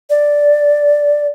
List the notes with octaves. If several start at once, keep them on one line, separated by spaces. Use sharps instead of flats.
D5